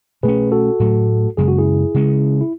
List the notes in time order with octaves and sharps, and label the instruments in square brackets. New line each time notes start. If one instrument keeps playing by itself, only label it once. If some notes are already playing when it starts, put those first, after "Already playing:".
[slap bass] B2 A3 C#4 [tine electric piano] G#4 B4
[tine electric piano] F#4 A4
[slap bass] A2 F#3 A3
[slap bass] F#2 C#3 G#3 [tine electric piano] G#4
[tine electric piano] F#4
E4 G#4
[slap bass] C#3 G#3 C#4
[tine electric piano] E4